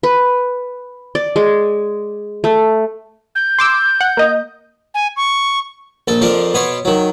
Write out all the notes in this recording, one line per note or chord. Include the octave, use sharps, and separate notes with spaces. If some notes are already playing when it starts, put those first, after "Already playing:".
B4
D5
G#3
A3
G6
C6 D6 E6
F#5
A#3 D#5
G#5
C#6
A#1 A4
F2 F3 D4 A#4 C6
B2 B3 C#5 C6
D#3 F#3